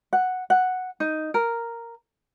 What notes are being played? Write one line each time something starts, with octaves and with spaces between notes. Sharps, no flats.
F#5
F#5
D#4
A#4